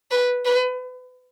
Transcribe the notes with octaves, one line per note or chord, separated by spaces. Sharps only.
B4
B4